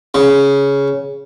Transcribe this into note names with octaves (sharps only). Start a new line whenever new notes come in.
C#3